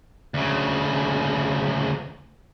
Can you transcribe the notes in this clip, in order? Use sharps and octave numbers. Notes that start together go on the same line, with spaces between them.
D2 C#3